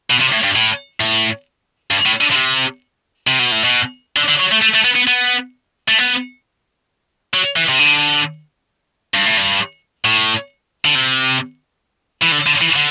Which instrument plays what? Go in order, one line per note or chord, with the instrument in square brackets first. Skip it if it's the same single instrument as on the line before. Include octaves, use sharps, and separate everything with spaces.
[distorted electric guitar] B2
C3
A2
G2
A2
A2
G2
A2
D3
D3
C3
C3
B2
A2
B2
D3
D3
F#3
A3
A3
A3
B3
B3
B3
A3
B3
F#3
E3
C3
D3
G2
A2
G2
A2
D3
C3
E3
D3
D3
E3
D3